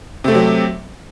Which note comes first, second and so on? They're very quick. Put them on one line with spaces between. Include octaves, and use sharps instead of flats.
C3 A3 C4 F#3